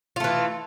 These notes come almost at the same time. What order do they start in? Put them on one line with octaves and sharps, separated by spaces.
F4 A3 E3